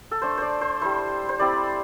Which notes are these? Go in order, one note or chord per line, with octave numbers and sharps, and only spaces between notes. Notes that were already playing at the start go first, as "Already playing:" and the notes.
A4
A3 D4 C5
C5 D5
C5
G3 E4 C5
C5
G3 C4 E4 D5